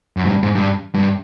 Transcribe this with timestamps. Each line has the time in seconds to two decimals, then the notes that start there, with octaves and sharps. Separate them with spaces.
0.17 F#2
0.25 G#2
0.29 G2
0.43 G#2
0.55 G2
0.94 G2